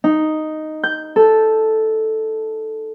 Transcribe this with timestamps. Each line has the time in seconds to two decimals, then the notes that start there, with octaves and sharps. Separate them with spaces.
0.04 D#4
0.84 G6
1.16 A4